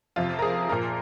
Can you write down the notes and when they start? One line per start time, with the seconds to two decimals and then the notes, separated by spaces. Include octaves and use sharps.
0.16 F2 C3 F3 F4
0.39 A#4
0.42 G#4
0.69 A#2 F3 A#4